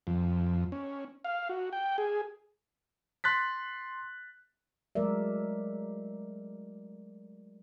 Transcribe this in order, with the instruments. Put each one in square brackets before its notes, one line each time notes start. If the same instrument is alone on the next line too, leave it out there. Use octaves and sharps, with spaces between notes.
[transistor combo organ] F2
C#4
F5
F#4
G5
G#4
[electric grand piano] C6 F#6 A6 B6
[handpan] F#3 G#3 A3 A#4 D5 E5